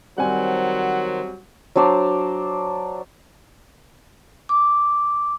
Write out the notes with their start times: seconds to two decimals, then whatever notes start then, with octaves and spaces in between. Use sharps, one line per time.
0.18 D#3 F#3 G3 C4 C5 F#5 G#5
1.76 F#3 D4 C5 D5
4.49 D6